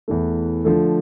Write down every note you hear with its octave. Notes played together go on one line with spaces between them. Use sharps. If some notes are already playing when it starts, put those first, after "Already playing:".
E2 E3 A3
D3 F3 A3